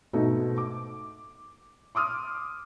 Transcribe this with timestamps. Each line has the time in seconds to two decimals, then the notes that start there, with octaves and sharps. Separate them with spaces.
0.13 G#2 B2 A3 D#4 F#4
0.58 D6
1.95 C6 D6 D#6 F6